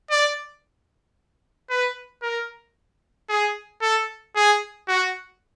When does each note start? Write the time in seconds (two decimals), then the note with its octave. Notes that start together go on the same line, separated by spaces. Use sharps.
0.11 D5
1.70 B4
2.22 A#4
3.29 G#4
3.82 A4
4.36 G#4
4.88 F#4